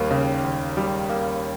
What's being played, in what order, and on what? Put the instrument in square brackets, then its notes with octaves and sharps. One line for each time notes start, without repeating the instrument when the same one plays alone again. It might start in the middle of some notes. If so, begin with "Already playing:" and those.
Already playing: [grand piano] D#2 G3 A#3
C#3
D#2
G3
A#3